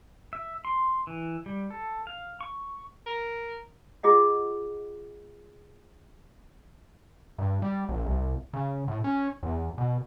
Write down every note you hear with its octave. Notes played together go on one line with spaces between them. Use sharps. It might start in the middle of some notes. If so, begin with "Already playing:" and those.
E5
C6
E3
G3
A4
F5
C#6
A#4
F4 G#4 D#5 F#5
G2
G3
A#1
C2
C#3
A2
C#4
E2
B2